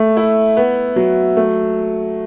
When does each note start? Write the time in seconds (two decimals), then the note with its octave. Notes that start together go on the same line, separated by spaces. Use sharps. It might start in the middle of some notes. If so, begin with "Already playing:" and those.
Already playing: A3
0.17 E4
0.57 B3
0.96 F#3
1.37 A3